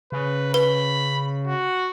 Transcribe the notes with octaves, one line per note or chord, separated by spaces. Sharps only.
C#3 B4
B4 B5
F#4